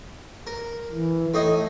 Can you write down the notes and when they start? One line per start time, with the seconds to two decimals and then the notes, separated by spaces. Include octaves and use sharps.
0.47 A#4
0.92 E3
1.34 A2 A3 D#4 D#5